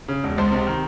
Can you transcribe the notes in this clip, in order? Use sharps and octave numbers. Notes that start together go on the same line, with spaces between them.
C#3
E1
C#2 C5
C3
D#3